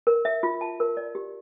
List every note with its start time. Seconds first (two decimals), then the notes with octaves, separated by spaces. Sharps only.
0.07 A#4
0.25 E5
0.43 F4
0.61 A5
0.80 A#4
0.97 D5
1.15 G4